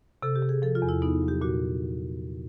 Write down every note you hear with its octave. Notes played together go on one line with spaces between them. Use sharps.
C3 A4
G4
C3
G#4
F3 A4
F4
E2
E4
B3 D#4
F#3
G4
A#2 F#4